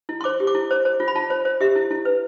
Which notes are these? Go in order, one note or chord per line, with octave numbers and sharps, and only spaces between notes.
E4
C6
C5 D6
G4
D6
E4
C5
C5
F4
B5
F4 A5
C5
C5
G4 E5
E4
E4
B4